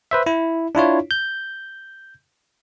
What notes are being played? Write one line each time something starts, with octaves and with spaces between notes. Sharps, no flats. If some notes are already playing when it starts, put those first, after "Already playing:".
B4 C5 E5
E4
D4 E4 F4 C#5
G6